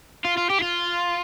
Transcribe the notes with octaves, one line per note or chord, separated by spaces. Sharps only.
F4
F4
G4
E4
F4